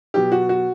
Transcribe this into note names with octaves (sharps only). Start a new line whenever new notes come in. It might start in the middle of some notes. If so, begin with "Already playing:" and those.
B2 F#3 G4
F#4
F#4